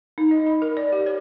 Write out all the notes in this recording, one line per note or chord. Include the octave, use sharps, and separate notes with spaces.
D#4
D#5
B5
A#4
D5
G4
C#5